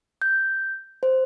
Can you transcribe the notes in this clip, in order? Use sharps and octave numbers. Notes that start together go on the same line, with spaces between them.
G6
C5